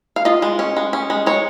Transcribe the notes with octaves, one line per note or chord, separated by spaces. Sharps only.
F5
F4 D#5
G#3
C#4
G#3
C#4
G#3
G#3 C#5